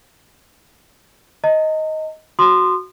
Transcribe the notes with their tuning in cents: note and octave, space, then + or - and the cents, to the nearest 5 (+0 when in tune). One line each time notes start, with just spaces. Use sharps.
D#5 +10 A#5 -40
F#4 +0 C6 -10 D#6 -35